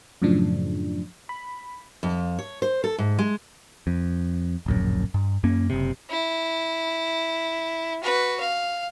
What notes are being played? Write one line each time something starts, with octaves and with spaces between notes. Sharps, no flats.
F#2 A2 C#3 F3 D4
B5
F2
C#5
C5
A4
G#2
G#3
F2
D1 A#1 F#2
G2
F#2 A#3 C#4
F#1 C3
E4
F#4 B4
F5